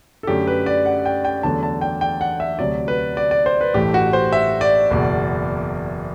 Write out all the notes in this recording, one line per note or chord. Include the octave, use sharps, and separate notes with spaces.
A4
F#2 D3 A3 G4
B4
D5
F#5
G5
G5
E2 D3 F#3 A3 A5
A5
G5
G5
F#5
E5
D2 C3 F#3 D5
B4
D5
D5
C5
B4
A1 G2 E3 A3 G4
F#4
C5
E5
D5
F#1 E2 B2